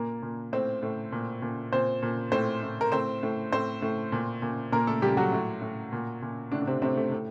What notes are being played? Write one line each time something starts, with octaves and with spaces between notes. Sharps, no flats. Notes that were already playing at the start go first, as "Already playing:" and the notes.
Already playing: A#2 A#3 A#4
A#2
A2 C4 C5
A2
A#2
A#2
A#2 C4 C5
A#2
A2 C4 C5
A2
A#4
A2 C4 C5
A2
A2 C4 C5
A2
A#2
A#2
A#2 A#3 A#4
A3 A4
A#2 G3 G4
F#3 F#4
A2
A2
A#2
A#2
A2 D3 D4
D4
C3 C4
A2 C3 C4
A3
A2